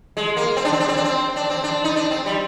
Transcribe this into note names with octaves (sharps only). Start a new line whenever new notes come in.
G#3
A#3
C4
D4
C4
D4
C4
D4
C4
D4
C4
D4
D#4
D4
C4
G3